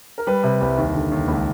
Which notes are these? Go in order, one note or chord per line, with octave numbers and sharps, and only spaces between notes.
A#4
G3 B4
C3
C2
D#2
D3
D#2
C#2